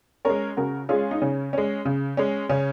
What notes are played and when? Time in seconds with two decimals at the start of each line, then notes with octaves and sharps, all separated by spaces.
0.25 G#3 C#4 A#4 C#5
0.57 C#3 F#4 A#4
0.89 G#3 C#4 F4 G#4
1.11 D#4
1.22 C#3 C#4
1.53 G#3 C#4
1.85 C#3
2.17 G#3 C#4
2.49 C#3 C#4